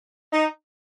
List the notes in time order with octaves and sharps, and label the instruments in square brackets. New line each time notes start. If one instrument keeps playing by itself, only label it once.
[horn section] D#4